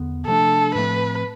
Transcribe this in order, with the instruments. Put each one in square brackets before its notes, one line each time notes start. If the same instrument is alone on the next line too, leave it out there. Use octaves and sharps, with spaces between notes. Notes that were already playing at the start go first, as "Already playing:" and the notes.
Already playing: [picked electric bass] E2 D3 B3
[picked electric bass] C3 F3 A3 D4 [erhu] A4
[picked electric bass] A2 F3 A3 C4 [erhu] B4